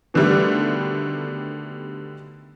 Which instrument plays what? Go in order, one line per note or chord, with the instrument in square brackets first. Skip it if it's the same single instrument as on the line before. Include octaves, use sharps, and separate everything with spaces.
[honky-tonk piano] B2 D3 D#3 G3 A3